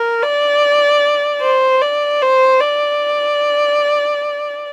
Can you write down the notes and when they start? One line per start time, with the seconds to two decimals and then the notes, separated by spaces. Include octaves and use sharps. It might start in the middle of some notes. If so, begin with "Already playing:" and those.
Already playing: A#4
0.23 D5
1.41 C5
1.81 D5
2.22 C5
2.60 D5